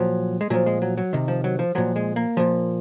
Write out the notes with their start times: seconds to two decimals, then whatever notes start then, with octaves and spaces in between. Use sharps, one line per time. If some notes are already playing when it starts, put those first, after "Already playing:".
Already playing: A#2 F3 F#3
0.41 G#3
0.50 A#2 F3 F#3
0.66 G#3
0.82 F#3
0.98 F#3
1.13 C3 D#3
1.28 F3
1.44 F#3
1.59 F3
1.75 A#2 F3 F#3
1.96 G#3
2.16 A#3
2.37 A#2 F3